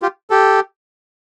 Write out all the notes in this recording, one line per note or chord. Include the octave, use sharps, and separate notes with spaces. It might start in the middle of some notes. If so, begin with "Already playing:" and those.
F4 G4
G4 A4